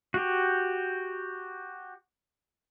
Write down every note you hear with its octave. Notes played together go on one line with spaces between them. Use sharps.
F#4 G4